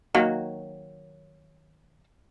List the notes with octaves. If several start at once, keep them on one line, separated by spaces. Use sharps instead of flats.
D#3 F#3 A#3